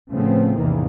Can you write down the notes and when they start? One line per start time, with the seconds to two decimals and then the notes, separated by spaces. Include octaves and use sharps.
0.10 A2 C#3 F3 A3 B3 C4
0.57 A1 E2 C3 D#3 E3 A#3